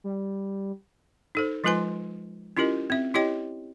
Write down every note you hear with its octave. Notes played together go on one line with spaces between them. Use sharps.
G3
D#4 A4 C5
F3 G#3 F4 B4 G#5 C6
C#4 E4 F4 G4 A#4 D#5
C4 E5
E4 G4 C#5 D#5 G5